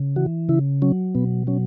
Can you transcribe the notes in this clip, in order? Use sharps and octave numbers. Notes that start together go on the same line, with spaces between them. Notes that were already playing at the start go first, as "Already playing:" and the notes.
Already playing: C#3
E3 F#4
C#3 E4
F#3 C#4
B2 B3
F#3 C#4